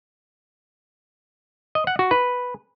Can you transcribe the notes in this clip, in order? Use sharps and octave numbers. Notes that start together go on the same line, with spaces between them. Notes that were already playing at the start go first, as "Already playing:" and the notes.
D#5
F#5
F#4
B4